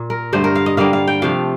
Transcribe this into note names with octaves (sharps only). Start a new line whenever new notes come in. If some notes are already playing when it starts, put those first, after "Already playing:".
Already playing: A#2
A#4
G2 D3 A3 C5
A#4
F5
D#5
D3 G3 A#3 F5
F5
G5
C3 F3 A3 F5